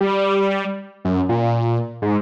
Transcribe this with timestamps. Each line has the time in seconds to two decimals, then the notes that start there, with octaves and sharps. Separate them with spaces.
0.01 G3
1.05 F#2
1.29 A#2
2.02 G#2